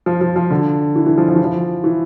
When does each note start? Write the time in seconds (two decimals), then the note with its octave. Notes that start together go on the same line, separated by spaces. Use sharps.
0.06 F3
0.21 F3
0.36 F3
0.51 D3
0.95 E3
1.06 E3
1.18 F3
1.29 F3
1.36 E3
1.44 F3
1.84 E3